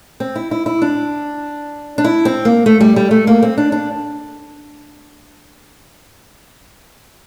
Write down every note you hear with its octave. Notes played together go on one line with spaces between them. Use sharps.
C4
E4
E4
E4
D4
D4
E4
C4
A#3
A3
G3
G3
A3
A#3
C4
D4
D4